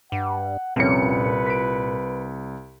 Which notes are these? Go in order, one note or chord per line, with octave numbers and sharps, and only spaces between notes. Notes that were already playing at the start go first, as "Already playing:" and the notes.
G2 F#5
C2 F2 A#2 C#4 B4 C#7
B6 D7